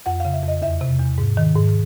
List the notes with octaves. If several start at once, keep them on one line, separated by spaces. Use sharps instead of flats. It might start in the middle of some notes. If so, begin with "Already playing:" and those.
F2 F#5
F5
C#3
E5
F2 D#5
E2 E5
C3
E2
G#2
D#3
G#2